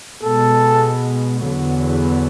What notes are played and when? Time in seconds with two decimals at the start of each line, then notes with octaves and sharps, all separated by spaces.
0.23 B2 G#3 B3 A4
1.42 E2 D3 F#3 B3